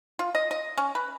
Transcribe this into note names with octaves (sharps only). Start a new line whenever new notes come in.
F4
D#5
D#5
C#4
B4